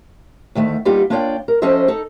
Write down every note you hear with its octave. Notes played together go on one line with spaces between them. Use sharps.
D2 D#3 A3
G3 A#3 B3 D#4 F4 G4
A#3 D4 F4 C#5 D5 G5
A#4
F3 C#4 A4 C5 D#5 E5
D#4 A4